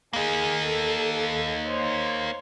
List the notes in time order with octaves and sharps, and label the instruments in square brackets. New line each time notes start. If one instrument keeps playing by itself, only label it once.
[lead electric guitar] A#3 D#4 [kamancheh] G#4
[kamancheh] A4
C5 C#5